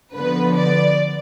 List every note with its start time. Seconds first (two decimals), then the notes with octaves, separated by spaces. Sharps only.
0.15 D3 F3 B3 B4
0.56 D5